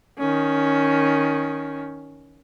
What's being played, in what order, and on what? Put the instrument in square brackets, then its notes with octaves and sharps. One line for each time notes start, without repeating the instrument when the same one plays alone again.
[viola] D#3 C#4